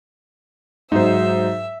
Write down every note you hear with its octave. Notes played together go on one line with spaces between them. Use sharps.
G#2 F#3 D#4 C5 E5